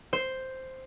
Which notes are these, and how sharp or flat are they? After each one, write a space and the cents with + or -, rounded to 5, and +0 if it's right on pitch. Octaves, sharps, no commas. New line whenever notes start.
C5 +0